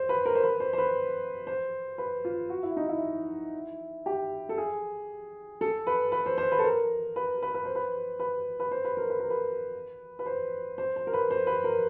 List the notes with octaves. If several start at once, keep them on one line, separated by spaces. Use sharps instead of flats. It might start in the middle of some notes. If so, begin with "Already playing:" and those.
Already playing: C5
B4
A#4
C5
B4
C5
C5
B4
C5
B4
F4
F#4
E4
D#4
E4
G4
A4
G#4
A4
B4
B4
C5
C5
B4
A4
A#4
B4
B4
B4
C5
B4
B4
B4
C5
B4
A#4
B4
A#4
B4
B4
C5
C5
C5
A#4
B4
C5
B4
A#4